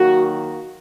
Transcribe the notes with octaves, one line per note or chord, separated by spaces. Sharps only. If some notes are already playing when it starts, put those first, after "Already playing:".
Already playing: D#3 F#3 A#3 F#4